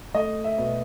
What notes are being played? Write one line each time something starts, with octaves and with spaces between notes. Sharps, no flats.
A3 D#5
E5
B2